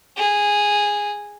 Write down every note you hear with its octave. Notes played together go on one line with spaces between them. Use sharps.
G#4